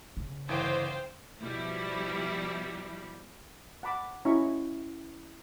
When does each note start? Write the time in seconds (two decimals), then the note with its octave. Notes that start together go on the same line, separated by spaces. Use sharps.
0.17 C#3
0.49 G1 E3 C5 F5 G5 D7
1.41 B2 F3 G3 E4
3.83 F#5 A5 B5 D6
4.25 C#4 E4 F#4 D#5 B5 C#6